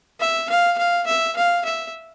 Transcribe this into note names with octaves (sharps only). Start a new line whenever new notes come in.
E5
F5
F5
E5
F5
E5